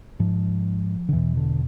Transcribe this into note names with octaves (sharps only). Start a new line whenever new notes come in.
G#2 F3
D3
E2 B2 E3
D3